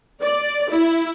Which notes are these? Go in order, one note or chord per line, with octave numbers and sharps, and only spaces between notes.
D5
E4